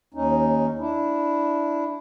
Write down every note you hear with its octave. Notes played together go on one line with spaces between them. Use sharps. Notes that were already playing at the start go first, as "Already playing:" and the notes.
D#2 C#4 D#4
D4 E4